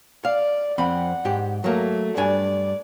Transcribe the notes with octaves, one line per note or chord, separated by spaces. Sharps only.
D5 F5
F2 C4 F#5 B5
G#2 G4
F#3 A3 A#3
G2 D4 D5 G#5